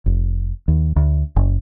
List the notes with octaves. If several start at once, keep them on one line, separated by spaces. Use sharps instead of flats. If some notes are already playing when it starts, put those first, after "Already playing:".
F1
D#2
D2
F#1